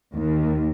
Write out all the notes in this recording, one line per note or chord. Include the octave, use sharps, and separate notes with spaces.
D#2